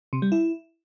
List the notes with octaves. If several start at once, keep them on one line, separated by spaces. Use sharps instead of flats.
C3
G3
E4